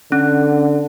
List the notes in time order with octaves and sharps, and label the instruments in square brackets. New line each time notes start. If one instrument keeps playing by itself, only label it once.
[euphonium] D3 [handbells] C#4